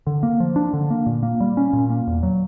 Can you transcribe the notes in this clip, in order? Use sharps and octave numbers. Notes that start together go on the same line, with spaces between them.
D3
A#3
F3
D4
D3
A#3
A#2
A#3
G3
C#4
A#2
A#3
E2
F#3